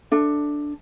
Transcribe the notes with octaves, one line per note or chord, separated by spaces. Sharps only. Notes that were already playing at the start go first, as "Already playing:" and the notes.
D4 A4 E5